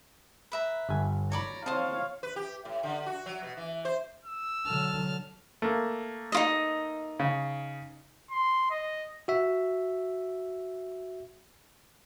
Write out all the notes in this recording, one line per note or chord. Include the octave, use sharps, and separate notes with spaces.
B4 E5 A#5
G1 G2 G#5
C#5 D5 A#5 B5
C4 C5 C#5 D#5 F5 A5
B4
G4
A2
D3
F#4
F#3
B2
E3
C5
E6
D3 F#3 A5 F6
A3 A#3
D#4 F4 D#5
C#3
C6
D#5
F#4 E5